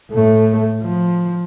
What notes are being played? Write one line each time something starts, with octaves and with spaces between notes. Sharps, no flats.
A2 A3
F3